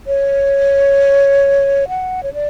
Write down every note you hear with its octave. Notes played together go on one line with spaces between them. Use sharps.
C#5
F#5
C#5
D5